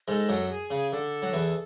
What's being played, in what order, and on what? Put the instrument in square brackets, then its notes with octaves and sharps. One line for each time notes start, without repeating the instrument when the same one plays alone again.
[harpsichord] G#2 G#3 [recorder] A4
[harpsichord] F#2 F#3
[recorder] G#4
[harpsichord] C#3
[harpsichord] D3 [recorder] A4
[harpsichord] F#3
E2 E3